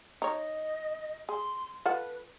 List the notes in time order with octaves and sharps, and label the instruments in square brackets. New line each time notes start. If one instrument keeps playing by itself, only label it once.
[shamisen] D#4 C#5 [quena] D#5
[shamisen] G#4 [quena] C6
[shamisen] F4 A4 F#5 [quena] B4